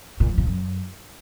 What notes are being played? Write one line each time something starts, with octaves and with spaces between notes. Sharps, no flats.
A#2
F2
A#2
F#2